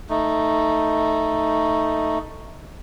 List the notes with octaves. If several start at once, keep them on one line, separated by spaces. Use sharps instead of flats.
A3 D#4